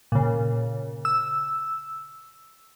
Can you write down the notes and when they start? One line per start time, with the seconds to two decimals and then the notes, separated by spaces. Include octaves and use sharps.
0.12 A#2 C#3
1.05 E6